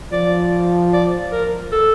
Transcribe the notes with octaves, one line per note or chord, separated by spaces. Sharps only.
F3 D5
D5
A#4
A4